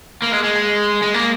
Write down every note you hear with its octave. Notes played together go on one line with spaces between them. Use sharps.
A#3
G#3
G#3
G#3
A#3